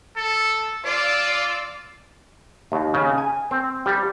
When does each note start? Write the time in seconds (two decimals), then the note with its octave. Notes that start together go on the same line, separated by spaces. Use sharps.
0.16 A4
0.85 F4 D5 D6 E6
2.72 D#2
2.94 C#3
3.18 G#5
3.51 C4
3.86 G3